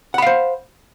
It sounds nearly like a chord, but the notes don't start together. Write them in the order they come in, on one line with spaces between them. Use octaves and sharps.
F#5 B5 F5 C5